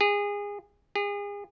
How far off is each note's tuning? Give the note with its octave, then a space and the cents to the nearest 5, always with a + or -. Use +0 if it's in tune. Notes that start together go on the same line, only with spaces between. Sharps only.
G#4 -25
G#4 -35